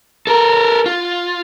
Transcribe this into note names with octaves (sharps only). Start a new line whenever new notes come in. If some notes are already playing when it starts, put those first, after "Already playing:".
A4 A#4
F4